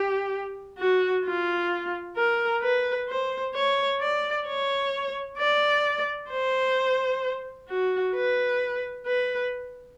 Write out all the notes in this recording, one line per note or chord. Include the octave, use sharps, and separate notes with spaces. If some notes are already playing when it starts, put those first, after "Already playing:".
Already playing: G4
F#4
F4
A#4
B4
C5
C#5
D5
C#5
D5
C5
F#4
B4
B4